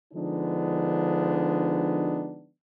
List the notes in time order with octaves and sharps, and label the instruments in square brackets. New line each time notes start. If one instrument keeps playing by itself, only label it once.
[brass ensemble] D3 F3 G#3 B3 D4 D#4